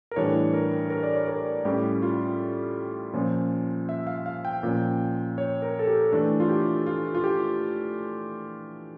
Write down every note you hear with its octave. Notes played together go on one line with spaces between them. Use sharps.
A#4
A2 E3 G3 D4 C#5
A#4
A#4
D5
C#5
A#4
A2 G3 C#4 G4
F4
A#2 F3 C#4
E5
F5
F5
G5
A#2 F3 C#4
C#5
A#4
A4
G4
E3 A3 D4
F4
G4
F4
F4
G4